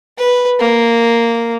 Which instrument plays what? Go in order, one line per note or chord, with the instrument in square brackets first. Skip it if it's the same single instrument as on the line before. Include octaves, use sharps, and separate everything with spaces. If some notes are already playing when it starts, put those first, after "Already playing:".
[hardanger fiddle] B4
A#3